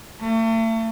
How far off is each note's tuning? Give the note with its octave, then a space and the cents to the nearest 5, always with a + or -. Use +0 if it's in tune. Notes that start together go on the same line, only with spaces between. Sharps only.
A3 +40